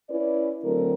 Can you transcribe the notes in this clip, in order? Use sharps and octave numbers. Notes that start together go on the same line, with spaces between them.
C#4 E4 B4 D5
D3 F#3 A3 C4 E4 A#4